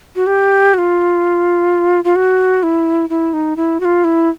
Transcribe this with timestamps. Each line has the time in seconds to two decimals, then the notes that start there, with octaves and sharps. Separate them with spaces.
0.16 F#4
0.27 G4
0.74 F#4
0.78 F4
2.04 F4
2.16 F#4
2.63 E4
3.10 E4
3.33 D#4
3.56 E4
3.80 F#4
3.85 F4
4.04 E4